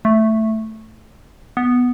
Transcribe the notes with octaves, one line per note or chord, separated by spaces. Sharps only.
A3
B3